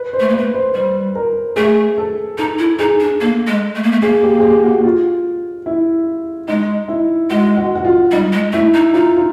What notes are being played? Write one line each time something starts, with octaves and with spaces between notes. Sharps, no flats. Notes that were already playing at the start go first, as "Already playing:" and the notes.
Already playing: B4
C5
A3
A#3
A3 B4
C5
G3 C5
A#4
A3 G#4
A4
D#4 A4
E4
D#4 G#4
D4
A#3 A4
G#3
A3
A#3
A3
A#3 G#4
G4
G#4
G4
F#4
F#4
F4
E4
G#3 D#4
E4
G#3 F#4
F#4
F#4
F4
G3 D#4
G#3
A3 E4
D#4
D#4 F4
F4